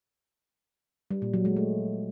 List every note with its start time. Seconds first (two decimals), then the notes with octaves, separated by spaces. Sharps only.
1.11 G3
1.22 A#2
1.33 F#3
1.45 G#3
1.56 A3